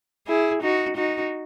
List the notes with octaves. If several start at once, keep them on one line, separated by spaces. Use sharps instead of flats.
E4 G#4
D#4 F#4
D#4 F#4